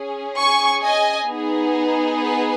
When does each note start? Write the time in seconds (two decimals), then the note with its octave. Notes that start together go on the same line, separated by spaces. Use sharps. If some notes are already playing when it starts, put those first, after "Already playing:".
Already playing: C#4 G#4
0.37 G#5 C#6
0.83 D#5 G#5
1.29 B3 D#4 G#4
2.22 B4